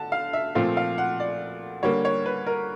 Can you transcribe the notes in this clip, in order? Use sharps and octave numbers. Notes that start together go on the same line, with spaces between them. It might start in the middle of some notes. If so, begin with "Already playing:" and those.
Already playing: D3 A5
F5
E5
A#2 F3 A3 C4 F5
F5
F#5
D5
D3 G3 A#3 C#5
C#5
B4
A#4